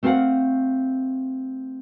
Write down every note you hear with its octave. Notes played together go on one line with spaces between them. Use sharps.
A3 C4 A#4 C#5 F5 F#5